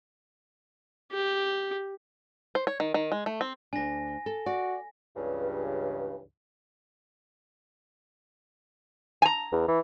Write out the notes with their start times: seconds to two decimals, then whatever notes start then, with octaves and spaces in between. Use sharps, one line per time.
1.12 G4
2.55 C5
2.67 C#5
2.80 D#3
2.94 D#3
3.12 G#3
3.26 A3
3.41 C4
3.73 D2 D4 G#5 A#6
4.26 A4
4.46 F#4 D5
5.17 C#2 G2 C#3 E3
9.22 G#5 A#5
9.52 E2
9.68 E3